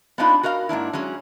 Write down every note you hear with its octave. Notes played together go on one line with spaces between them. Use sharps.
B3 C4 D4 D#4 F4 B4
F#4 A#4 D#5 F5
G#2 A#3 D4 E4
F#3 G#3 C#4 G#4